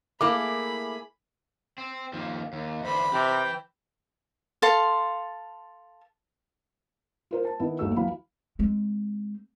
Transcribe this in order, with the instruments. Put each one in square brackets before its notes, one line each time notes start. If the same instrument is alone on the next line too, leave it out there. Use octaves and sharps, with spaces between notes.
[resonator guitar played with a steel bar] A3 A#3 E4 [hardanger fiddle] G#4 B5 [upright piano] D6
[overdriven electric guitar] C4
D#2 F3
D#2
[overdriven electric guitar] E2 D3 [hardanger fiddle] C5 B5
[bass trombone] C3 [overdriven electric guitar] E3 [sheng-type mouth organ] G5
[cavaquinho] A4 F5 C6
[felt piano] F4 A#4 C5
A5
D#3 B3 E4
G1 D#2 A3 F#4 E6
E3 F#3 F5 B5
[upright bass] G#3 C4